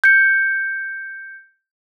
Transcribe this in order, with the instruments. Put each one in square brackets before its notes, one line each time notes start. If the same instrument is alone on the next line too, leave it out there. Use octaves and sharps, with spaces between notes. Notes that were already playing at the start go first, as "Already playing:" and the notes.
[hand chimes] G6 C#7